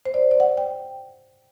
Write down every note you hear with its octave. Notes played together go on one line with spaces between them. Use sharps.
C5
D5
D5
F#5
G5